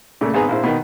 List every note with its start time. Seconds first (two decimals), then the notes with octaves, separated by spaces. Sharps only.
0.21 A#2 C#3 A3
0.34 G#1 B3 G#4 A#5
0.49 A#1 E4 C5
0.64 B2 D#3